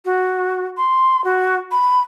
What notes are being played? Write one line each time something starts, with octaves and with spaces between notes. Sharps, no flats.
F#4
C6
F#4
B5